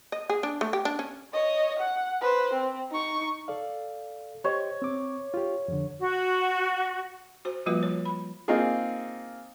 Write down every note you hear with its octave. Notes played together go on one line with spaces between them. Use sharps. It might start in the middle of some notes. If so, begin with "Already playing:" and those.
D#5
G#4
D4
A3
G4
D4
C#4
C#5 D#5
F#5
B4 C5
C4
D#4 C#6
A4 D5 F5
G4 C5 C#5 D#5
C4 D6
F4 G4
F2 D3
F#4
F#4 C5
F3 G3 A#3 F4 F#4 B4
C#5
B5
A#3 C4 D#4 F4 G#4